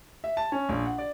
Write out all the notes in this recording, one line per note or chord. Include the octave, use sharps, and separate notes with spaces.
E5
A5
C#4
A#1
F#5
D5